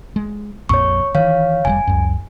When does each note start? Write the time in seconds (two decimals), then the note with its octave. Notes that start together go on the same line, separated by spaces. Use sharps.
0.16 G#3
0.69 A#1 F2 A#2 C#5 C#6
1.15 D#3 E3 C#5 F5
1.65 F1 B2 G3 G#5
1.87 C#2 F#2